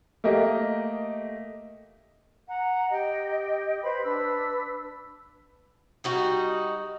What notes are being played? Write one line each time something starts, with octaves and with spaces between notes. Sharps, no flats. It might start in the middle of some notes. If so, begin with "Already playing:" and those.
A3 A#3 G4 D#5
F#5 A#5
G4 D#5 G5
B4 C5 B5
D4 B4 E6
G3 D#4 F#4